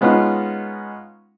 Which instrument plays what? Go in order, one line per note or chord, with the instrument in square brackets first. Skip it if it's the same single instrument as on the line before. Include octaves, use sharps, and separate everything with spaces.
[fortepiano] G#3 B3 C#4 D#4 F4